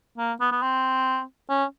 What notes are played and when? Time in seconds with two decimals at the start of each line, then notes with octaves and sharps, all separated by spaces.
0.18 A#3
0.40 B3
0.51 B3
0.62 C4
1.49 C#4